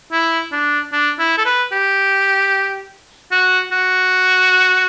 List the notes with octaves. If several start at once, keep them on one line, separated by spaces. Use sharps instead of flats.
E4
D4
D4
E4
A4
B4
G4
F#4
F#4